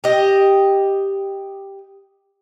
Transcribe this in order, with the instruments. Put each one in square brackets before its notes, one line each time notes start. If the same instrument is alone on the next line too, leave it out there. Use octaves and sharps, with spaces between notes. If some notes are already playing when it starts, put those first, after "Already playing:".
[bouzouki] G4 D#5